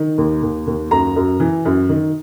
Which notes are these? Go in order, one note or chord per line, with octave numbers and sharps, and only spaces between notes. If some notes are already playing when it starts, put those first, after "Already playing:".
Already playing: D#3
D#2
D#2
D#2
F#2 A#5
F#2
E3
F#2
D#3